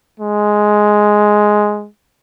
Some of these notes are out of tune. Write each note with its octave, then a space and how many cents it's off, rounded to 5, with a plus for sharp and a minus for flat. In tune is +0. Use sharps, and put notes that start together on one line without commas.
G#3 +5